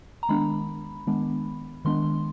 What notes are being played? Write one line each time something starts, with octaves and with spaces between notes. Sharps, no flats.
A#5
D#3 G#3 B3 D4 B5
D#3 G#3 B3 D4
D#3 G#3 B3 D4 C6